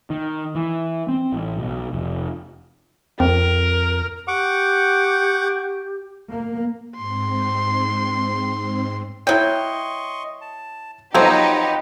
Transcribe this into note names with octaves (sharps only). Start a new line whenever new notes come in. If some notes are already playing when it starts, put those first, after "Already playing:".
D#3
E3
C4
A1
B1
F1
F2 C4 A#4
G4 F#5 C#6 D6
A#3
G#2 C4 C6
F#3 E4 C#5 D#5 G5 C6 C#6
A5
F3 F#3 C4 D#4 G4 B4 C5 F#5